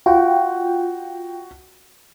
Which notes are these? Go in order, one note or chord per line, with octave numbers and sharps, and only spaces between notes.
F4 F#4 G5